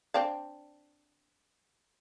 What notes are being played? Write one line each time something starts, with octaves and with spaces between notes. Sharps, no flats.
C4 D4 F5